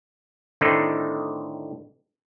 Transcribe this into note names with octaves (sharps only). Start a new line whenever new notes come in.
A2 D3 D#3 A3 C4 D#4